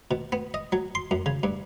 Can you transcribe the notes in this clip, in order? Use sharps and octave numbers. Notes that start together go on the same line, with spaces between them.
B2
B3
D#5
F#3
C6
F#2
C#3
G2